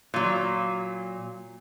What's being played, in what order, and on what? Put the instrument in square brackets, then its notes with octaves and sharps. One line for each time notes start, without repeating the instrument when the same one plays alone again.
[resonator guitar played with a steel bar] A#2 F#3